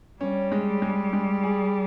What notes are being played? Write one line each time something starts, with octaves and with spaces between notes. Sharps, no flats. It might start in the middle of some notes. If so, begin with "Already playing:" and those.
G3 C#4
G#3
G#3
G#3
G#4